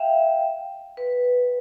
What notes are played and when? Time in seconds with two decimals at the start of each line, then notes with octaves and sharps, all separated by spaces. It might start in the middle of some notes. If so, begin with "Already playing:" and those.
Already playing: E5 F5 G5
0.97 B4